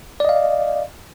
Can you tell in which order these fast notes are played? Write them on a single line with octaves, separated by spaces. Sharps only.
D5 D#5 F5